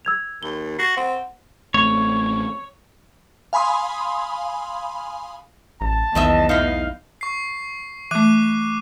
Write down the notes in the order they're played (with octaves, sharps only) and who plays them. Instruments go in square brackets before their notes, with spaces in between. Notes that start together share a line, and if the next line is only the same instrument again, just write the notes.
[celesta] E6 G#6 F7
[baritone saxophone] D#2 [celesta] G7
[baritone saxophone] F#4 [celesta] C7
[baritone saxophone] C4 [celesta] F#5
[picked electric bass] A1 A3 C4 [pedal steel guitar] C#5
[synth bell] F5 G#5 B5 C6 D#6
[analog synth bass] A1 [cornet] A5
[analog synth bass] B1 [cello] E2 [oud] D#3 D#5 E5
[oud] D#4 E4 [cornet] F5
[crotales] C#6 C7
[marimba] E3 A3 [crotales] D6 F#6 D#7